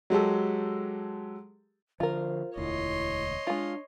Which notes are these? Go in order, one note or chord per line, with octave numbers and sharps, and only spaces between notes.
F#3 G#3 G4 A4
D3 F3 F4 A#4 C5
E1 D2 E4 C#5 D#5 C6
G#3 D4 F4